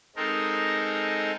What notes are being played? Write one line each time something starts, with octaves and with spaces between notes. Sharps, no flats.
G#3 C4 D#4 A4 A#4